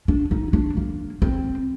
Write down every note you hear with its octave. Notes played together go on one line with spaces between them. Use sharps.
D4
D#4
D4
A#3
C4